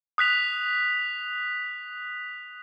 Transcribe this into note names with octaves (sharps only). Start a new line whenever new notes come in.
D#6 F#6 B6 F7